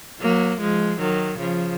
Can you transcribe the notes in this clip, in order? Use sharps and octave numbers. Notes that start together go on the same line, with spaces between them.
F#3 A#3
F3 G#3
D#3 F#3
C#3 F3